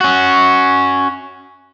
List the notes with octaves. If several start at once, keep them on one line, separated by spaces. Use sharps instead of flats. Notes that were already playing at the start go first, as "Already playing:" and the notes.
C#4 F#4